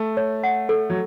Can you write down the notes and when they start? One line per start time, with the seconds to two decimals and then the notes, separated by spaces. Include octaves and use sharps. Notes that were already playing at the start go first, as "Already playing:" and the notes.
Already playing: A3
0.17 C#5
0.43 F#5
0.69 A4
0.90 F#3